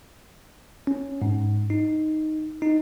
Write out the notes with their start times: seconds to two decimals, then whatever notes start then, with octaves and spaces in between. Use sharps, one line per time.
0.87 C#4
1.22 G#2
1.70 D#4
2.62 D#4